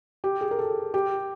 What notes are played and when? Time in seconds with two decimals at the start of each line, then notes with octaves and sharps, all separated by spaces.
0.24 G4
0.41 G#4
0.51 A#4
0.59 A4
0.94 G4